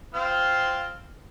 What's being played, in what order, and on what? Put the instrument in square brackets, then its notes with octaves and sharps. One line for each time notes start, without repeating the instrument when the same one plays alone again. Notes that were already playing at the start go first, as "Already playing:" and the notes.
[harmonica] C4 F4 F6